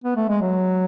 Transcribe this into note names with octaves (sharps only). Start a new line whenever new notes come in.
B3
A3
G#3
F#3